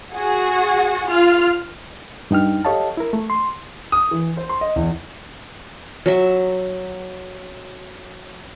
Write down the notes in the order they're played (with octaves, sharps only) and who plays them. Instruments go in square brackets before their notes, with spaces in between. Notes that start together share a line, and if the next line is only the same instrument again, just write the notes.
[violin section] F#4 G#4 F#5
F4 F6
[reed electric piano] G2 D#4 G5 F6
G4 A4 C#5 D#5 F5 A5
E4 A#4
A3
C6
[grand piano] D#6
E3
C5
C6
D#5
E2
[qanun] F#3 E5